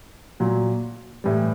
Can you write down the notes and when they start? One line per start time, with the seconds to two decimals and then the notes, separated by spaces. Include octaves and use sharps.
0.40 A#2 F#3
1.24 A2 E3 G3